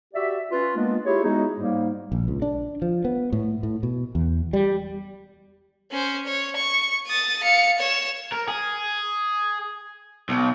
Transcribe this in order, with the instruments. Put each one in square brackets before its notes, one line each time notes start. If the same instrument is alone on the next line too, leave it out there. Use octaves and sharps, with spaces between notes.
[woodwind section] F#4 G4 D5 E5
C#4 F4 B4
G#3 A#3 B3 D4 F4
E4 F4 G4 G#4 C#5
G#3 B3 D#4 E4 F#4 G#4
G#2 G3 A#3
[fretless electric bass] A#1
C#2
D4
F3
B3
A2
A2
B2
E2
G3
[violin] C#4 C5
C#5
C#6
D#6 A6
F5 C#7
C#5 E7
[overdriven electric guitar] A#4
G#4
B1